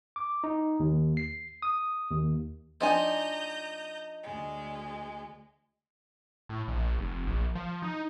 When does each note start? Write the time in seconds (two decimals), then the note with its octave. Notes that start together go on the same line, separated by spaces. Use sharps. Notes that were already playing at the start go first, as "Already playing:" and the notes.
0.16 D6
0.44 D#4
0.80 D#2
1.17 C7
1.62 D#6
2.11 D#2
2.81 F3 D4 D#4 G#5 A#5 D#6 G6
4.23 D2 G#3
6.49 A2
6.68 A#1
6.99 F1
7.27 A#1
7.55 F3
7.82 D#4